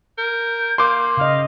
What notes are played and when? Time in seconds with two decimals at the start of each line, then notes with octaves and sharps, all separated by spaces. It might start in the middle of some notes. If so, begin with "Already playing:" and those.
0.18 A#4 G6
0.78 A#3 C6 D6
1.17 C#3 D#5 F5